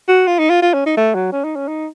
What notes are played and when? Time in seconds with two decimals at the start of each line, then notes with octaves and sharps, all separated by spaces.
0.08 F#4
0.27 F4
0.39 D#4
0.50 F4
0.62 F4
0.74 C#4
0.86 D#4
0.97 A3
1.15 F#3
1.32 C#4
1.44 D#4
1.56 C#4
1.68 D#4